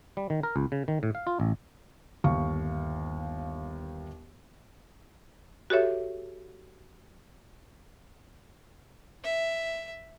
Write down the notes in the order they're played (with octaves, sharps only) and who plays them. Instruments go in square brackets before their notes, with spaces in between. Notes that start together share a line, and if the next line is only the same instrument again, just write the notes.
[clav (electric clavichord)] G3
D#3
A#4
C#2
C#3
D#3
A2
F5
F4
A1
[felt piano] G1 D#2 F5 C#6
[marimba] F#4 G4 A4 C#5 E5
[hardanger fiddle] E5